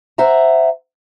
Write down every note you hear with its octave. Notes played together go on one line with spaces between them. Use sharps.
C5 E5 F#5 A#5